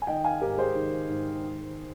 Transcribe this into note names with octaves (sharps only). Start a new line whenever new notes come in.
G#5
D#3 D#5 G5
F5 G#5
G#2 G4 A#4
G#4 C5
D#3
G#2
D#3